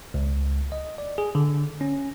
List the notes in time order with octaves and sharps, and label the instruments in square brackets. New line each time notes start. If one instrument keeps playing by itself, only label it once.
[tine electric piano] C#2
D#5
D5
G#4
D3
C#4